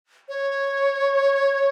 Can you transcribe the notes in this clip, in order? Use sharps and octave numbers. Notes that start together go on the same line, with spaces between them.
C#5